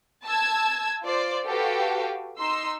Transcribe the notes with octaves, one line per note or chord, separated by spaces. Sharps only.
A5 E6 G#6
F4 C5 D5
F#4 G4 A4 B4 F5 G5
D#4 C6 E6